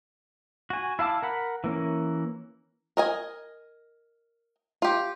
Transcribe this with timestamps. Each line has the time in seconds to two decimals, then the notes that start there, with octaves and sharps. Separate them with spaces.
0.70 F#4 G#5
0.99 E4 F5 A5 D6
1.22 A#4 F#5 B5
1.64 E3 A#3 C#4
2.97 A#4 D#5 G#5
4.82 F4 G4